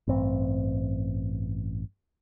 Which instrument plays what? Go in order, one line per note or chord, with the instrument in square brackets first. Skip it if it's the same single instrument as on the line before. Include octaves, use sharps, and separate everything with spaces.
[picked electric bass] A1 G2 C4